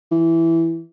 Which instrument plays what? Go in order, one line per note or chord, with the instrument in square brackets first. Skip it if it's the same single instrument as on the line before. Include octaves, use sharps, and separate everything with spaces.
[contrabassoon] E3